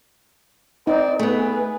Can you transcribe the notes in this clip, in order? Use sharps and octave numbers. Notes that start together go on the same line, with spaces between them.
C4 D#4 D5
A3 B3 G#4 B4